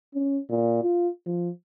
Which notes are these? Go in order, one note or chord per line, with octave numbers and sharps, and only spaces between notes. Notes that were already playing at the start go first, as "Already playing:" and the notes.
C#4
A#2
F4
F3